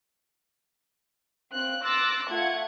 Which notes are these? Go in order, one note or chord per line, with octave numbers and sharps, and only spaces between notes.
C4 F5 F#6
C6 D6 E6 F#6 A6 A#6
A3 F4 F#5 G#6 C#7